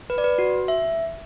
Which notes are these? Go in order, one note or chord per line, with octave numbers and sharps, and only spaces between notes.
B4
D5
B4
F#4
E5